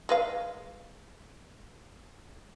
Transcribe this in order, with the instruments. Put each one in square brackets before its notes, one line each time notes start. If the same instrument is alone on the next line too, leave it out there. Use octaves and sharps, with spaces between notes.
[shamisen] G#3 B4 F5